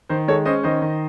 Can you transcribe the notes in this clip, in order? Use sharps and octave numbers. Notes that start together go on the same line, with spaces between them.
D#3 C5
G#3 A4 C#5
C#4 C5 D#5
D#3 C5 D#5
D#3